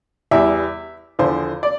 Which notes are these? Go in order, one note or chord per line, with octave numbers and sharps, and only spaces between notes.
E2 E3 G3 E5
E2 D3 F3 C5
D5